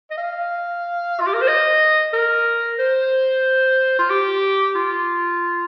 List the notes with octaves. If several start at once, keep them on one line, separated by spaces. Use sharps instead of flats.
D#5
F5
F4
G4
A#4
C5
D#5
A#4
C5
F4
G4
F4